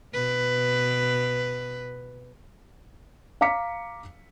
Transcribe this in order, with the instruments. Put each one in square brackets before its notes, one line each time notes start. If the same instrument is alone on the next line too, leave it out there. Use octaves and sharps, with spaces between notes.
[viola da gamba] B2 B4
[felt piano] F5 A#5 D6 B6 C#7